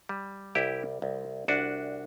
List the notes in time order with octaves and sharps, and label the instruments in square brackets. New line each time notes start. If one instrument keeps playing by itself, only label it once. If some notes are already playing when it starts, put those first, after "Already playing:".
[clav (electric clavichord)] G3
C2 E4 G4
C2
C2 D4 F#4